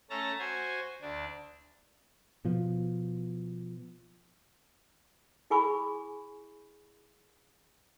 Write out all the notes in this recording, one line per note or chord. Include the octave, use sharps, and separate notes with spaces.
A3 C#4 A4 A5 A#5
F#4 C5 G#5
D2 D4
B2 F3
E4 G#4 G#5 B5 C#6